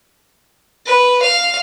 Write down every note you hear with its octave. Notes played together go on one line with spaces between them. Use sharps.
B4
F5